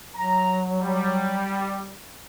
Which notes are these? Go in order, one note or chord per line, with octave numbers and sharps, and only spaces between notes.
F#3 A#5
G3